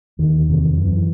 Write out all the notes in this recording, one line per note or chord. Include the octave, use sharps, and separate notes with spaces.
D#2 D#3
E2 C3
F#2 E3